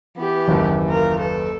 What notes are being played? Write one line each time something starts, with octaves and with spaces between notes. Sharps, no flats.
E3 B3 G4
F#1 D#2
F4 A#4
A4 B4